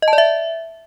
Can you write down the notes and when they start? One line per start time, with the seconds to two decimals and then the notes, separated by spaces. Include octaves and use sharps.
0.02 D#5
0.08 A5
0.13 D5
0.18 E5